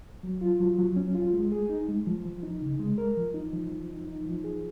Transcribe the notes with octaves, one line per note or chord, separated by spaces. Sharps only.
F#3
F4
F#3
F#3
C#4
F4
G#3
G#4
D#4
G#3
F3
F3
D#4
C#3
G#3
A#4
F3
D#4
F3
F3
D#4
D#4
F3
G#4